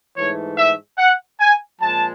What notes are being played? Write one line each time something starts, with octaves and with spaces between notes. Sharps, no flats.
G#2 E3 A3 C#5
E5
F#5
G#5
A#2 F3 G#3 A5